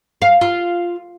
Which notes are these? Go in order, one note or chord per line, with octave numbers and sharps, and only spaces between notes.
F5
F4